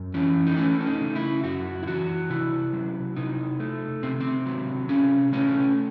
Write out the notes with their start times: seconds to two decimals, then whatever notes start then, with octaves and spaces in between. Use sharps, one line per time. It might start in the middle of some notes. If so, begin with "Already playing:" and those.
Already playing: F#2
0.14 E3 C#4
0.47 D#4
0.57 A3 C#4
0.80 C#4
0.87 D#4
1.01 C#3
1.15 E4
1.44 F#2 F#4
1.83 E4
1.87 E3 F#4
2.30 C3 E4
2.73 F#3
3.16 C3 D#4
3.60 A3
4.03 C3 C4
4.20 C4
4.46 F#3
4.89 C3 C#4
5.33 A3 C#4